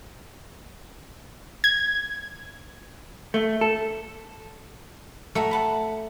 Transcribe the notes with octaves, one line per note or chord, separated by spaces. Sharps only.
G#6
A3
A4
A3 F#4 A#4 E5
F#5 A5 B5